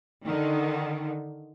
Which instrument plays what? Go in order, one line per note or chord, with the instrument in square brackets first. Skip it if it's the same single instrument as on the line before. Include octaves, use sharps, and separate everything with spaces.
[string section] D3 D#3